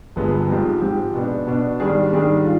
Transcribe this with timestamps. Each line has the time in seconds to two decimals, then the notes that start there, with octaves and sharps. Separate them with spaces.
0.16 G1 G2 F3 G#3 B3
0.48 G#2 F3 G#3 C4 G4
0.82 G#2 F3 G#3 C4 G4
1.14 B2 B3 D4
1.47 B2 B3 D4
1.80 G#2 D#3 G3 D4 G#4
2.12 G#2 D#3 G3 D4 G#4
2.44 F4